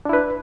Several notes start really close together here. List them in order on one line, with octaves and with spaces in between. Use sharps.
D4 E4 B4